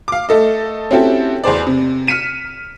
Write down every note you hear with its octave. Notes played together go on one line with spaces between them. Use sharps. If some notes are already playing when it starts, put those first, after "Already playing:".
F5 D6
A3 A4 D#5
C4 C#4 E4 F#4 G4 A4
E2 G#4 C5 D5
C3
F6 B6 C#7 D#7 E7